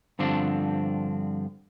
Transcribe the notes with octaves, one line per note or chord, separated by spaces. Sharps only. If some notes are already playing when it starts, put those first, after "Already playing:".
G2 D3 F3 C4 D4